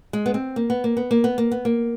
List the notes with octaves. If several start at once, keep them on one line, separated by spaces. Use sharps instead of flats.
G#3
B3
C4
A#3
B3
A#3
B3
A#3
B3
A#3
B3
A#3